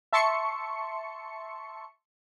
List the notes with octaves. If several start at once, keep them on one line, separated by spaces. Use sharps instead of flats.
E5 A5 C6 C#6 C#7